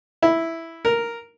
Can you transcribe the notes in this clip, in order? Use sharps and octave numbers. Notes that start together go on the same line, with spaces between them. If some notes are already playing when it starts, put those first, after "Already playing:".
E4
A#4